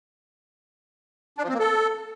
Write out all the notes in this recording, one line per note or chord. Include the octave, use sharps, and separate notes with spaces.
D4
F3
C4
A#3
A4